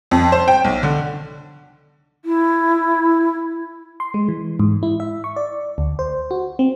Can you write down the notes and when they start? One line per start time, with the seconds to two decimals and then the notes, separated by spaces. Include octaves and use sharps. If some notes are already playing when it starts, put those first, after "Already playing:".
0.11 F2
0.32 C5
0.48 G5
0.64 B1
0.83 D3
2.25 E4
4.00 C6
4.14 G#3
4.29 E3
4.60 G#2
4.83 E4
5.00 E5
5.24 C#6
5.36 D5
5.78 D2
5.99 C5
6.31 F#4
6.59 C4